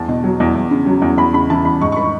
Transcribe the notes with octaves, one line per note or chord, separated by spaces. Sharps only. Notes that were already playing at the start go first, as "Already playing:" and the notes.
Already playing: E2 A5
B2
F#3
E2
E2
C#3
F#3
E2
E2 B5
C#3 B5
E3 A5
E2 B5
G#2 C#6
C#6
D#3 B5